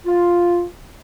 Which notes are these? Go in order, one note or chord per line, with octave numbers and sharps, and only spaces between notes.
F4